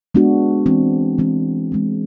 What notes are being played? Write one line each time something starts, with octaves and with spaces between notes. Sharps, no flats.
G#3 B3 D4 F#4
E3 G#3 C4
E3 G#3 C4
E3 G#3 C4